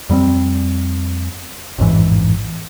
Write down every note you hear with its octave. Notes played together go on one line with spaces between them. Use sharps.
F2 G3 A#3 C4
A1 F2 G#2 E3